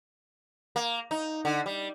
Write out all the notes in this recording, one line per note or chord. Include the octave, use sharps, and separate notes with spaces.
A#3
D#4
D3
G3